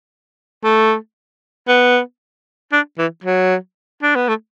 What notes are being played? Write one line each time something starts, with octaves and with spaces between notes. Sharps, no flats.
A3
B3
D4
E3
F#3
D4
B3
A3